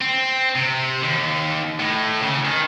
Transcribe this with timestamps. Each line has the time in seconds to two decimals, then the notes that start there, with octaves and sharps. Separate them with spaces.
0.01 C4
0.55 C3
1.03 D#2
1.80 A2
2.22 C#3
2.45 D#3